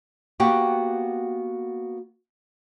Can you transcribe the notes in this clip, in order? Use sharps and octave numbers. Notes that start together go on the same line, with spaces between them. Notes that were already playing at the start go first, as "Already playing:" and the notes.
A#3 B3 F#4 G4 F#5 G5